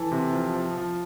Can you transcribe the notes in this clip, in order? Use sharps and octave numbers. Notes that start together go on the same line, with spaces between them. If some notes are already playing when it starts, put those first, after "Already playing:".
Already playing: E3 A4
C3
F3
F3
F3